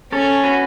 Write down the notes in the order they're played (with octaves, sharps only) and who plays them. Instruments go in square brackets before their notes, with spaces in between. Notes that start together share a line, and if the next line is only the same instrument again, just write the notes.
[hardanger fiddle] C#4 [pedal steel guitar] A4 C#5
[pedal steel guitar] F#4 B4